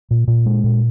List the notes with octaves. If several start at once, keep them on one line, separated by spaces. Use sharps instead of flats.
A#2
A#2
G#3
A#2